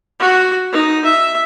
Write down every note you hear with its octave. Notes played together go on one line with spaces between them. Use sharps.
F#4
D#4
E5